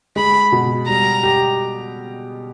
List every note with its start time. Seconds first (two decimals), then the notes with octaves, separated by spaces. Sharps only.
0.16 G#3 B5
0.52 B2
0.88 G3 A#5
1.23 G4